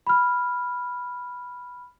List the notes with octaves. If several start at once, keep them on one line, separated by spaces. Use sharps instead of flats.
B5 F6